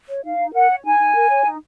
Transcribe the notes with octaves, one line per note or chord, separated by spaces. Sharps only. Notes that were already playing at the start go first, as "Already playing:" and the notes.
C#5
D#4 F5
D#4
A#4 F#5
C#5
D#4 G#5
D#4
A#4
C#5
D#4